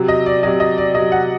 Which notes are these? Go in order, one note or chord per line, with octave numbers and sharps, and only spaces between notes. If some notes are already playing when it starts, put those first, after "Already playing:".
Already playing: C3 F#3
D#5
D5
C3 F#3 D#5
D#5
D5
C3 F#3 D#5
F#5